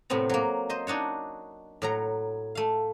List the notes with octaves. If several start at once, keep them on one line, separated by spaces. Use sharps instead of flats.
A2 C3 B3 C4 A#5
F#3 A#3
C5 D#5
D4 D#4 F#4 C#5
A2 F#3 A#5
A3 F5